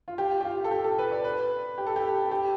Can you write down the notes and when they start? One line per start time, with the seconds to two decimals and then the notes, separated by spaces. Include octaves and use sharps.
0.08 F4
0.18 G4
0.41 G4
0.45 F4
0.64 A4
0.71 G4
0.84 A4
0.99 B4
1.11 D5
1.24 B4
1.78 G4
1.87 A4
1.96 G4
2.31 G4